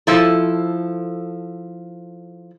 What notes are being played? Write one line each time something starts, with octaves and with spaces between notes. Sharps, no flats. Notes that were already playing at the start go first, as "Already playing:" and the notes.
F3 E4 A4